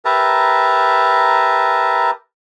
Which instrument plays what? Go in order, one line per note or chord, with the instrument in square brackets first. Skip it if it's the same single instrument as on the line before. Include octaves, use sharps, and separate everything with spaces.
[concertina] G4 A#4 B4 E5 A5 A#5